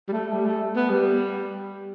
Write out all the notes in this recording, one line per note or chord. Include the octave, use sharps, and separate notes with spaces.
G3
A3
G3
A3
B3
G3